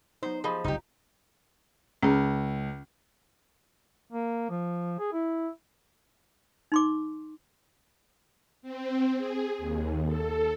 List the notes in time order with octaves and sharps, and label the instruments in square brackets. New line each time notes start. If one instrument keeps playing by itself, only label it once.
[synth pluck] F#3 B3 D#4 [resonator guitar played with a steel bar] C5
[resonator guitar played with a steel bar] F3 [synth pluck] G4 C5 [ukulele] G#4 D#5 B5
[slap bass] F#1 C2 D3 [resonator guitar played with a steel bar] D#4 G4 [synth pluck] F4 A#5
[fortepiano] C#2 [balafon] C#4 G#4
[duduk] A#3
F3
G#4
E4
[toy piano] D#4 C6 D6
[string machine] C4
G#4
D#2
A4